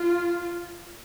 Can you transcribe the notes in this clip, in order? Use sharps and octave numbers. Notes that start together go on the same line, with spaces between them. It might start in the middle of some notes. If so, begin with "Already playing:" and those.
Already playing: F4